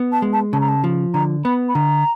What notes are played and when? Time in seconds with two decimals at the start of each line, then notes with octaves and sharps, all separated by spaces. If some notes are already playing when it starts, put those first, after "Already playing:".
Already playing: B3
0.12 A5
0.22 G#3
0.33 A5
0.53 C#3 A5
0.61 A#5
0.68 A5
0.84 F3
1.14 D3 A#5
1.44 B3 B5
1.69 B5
1.75 D3 A#5